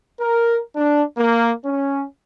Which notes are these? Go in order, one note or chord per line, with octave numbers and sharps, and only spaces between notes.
A#4
D4
A#3
C#4